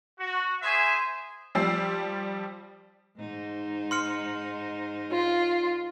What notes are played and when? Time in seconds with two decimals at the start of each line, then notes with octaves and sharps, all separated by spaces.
0.18 F#4
0.62 G#4 C5 E5 G#5
1.55 F3 G3 E6 C7
3.17 G#2 D#4 C5
3.91 C6 F6 C#7
5.12 F4